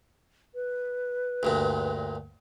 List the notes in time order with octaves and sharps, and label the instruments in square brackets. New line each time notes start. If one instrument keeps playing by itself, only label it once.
[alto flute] B4
[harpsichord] D2 G2 A#2